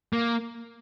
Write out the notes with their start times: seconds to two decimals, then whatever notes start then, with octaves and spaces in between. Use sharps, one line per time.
0.13 A#3